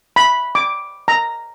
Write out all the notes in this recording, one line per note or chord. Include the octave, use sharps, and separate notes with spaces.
B5
D6
A#5